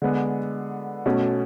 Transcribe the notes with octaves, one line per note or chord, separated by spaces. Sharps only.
D3 G#3 B3
B2 A3 C#4